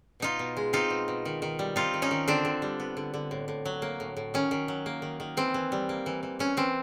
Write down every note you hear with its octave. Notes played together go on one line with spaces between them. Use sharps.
B2 D#4 F4
B2
G#3
C4 D#4 F4
B2
B2
D#3
D#3
G3
C4 D#4 F4
D#3
C#4 D#4
D#3
D3 C4 D4
D3
G3
B3
D3
D3
A2
A2
F#3
A#3
A2
A2
D#3 C#4
D#3
F#3
A#3
D#3
D#3
E3 C4
E3
G3
A#3
E3
E3
E3 C#4
E3 C4